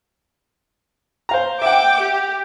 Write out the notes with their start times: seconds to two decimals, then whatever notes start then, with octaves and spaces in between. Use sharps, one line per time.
1.29 C5 F5 A#5
1.62 E5 F#5 G5 D6
2.01 G4